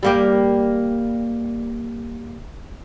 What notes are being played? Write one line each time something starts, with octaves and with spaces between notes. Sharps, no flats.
G3 A#3 G4